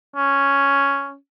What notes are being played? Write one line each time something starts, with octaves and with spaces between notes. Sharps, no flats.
C#4